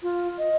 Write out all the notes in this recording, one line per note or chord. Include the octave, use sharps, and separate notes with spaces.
F4
D#5